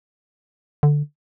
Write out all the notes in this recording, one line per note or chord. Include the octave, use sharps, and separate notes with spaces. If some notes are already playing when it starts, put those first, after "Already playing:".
D3